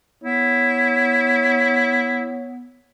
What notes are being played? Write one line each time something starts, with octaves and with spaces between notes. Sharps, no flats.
B3 E4 C#5